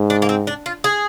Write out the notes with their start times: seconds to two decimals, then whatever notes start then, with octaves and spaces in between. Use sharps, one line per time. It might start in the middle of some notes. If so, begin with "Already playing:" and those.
Already playing: G#2
0.10 D4
0.22 A#3
0.29 C4
0.47 D4
0.66 F4
0.84 G#4